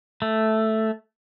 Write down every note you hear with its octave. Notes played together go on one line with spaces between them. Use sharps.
A3